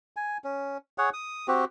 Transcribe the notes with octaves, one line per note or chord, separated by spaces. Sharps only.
G#5
C#4
G#4 C#5 F#5
D#6
C4 F#4 G4